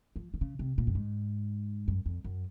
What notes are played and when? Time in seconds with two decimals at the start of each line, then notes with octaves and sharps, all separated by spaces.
0.16 F3
0.34 D#3
0.41 C#3
0.59 C3
0.78 A#2
0.87 F#2
0.95 G#2
1.88 F#2
2.06 F2
2.24 F#2